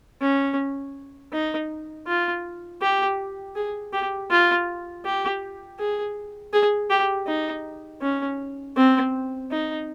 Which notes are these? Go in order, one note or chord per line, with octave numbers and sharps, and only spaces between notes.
C#4
D#4
F4
G4
G#4
G4
F4
G4
G#4
G#4
G4
D#4
C#4
C4
D#4